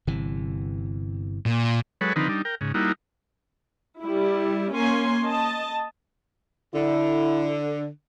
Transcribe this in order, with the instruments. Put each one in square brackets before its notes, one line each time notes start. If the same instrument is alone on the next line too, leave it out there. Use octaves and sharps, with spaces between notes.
[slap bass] G1 C3 E3
[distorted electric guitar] A#2
[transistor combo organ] F#3 G#3 A4 B4 C#5
D3 D#3 F3 C4 D#4 B4
G3 D4 D#4
A#4 G5
G#2 C#3
G3 A#3 D#4 E4 F#4
[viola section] G3 E4
A#3 C#4 G#5 C6
D#5 A5
[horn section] D3 [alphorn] E4